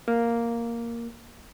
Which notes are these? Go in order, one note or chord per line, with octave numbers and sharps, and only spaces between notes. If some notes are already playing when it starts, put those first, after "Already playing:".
A#3